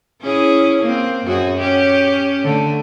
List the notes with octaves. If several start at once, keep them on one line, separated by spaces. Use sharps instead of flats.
C#4 E4 G#4
A#3 C4
F#2 F#4 G#4
C#4 G4
D3 A3